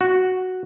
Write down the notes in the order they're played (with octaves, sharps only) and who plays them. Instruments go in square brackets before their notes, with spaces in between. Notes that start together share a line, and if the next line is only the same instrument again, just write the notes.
[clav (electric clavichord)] F#4